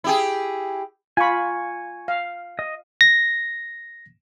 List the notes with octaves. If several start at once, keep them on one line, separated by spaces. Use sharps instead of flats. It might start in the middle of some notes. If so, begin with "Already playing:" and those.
E4 G4 G#4
F4 G#5 B5 C#6
F5
D#5
A#6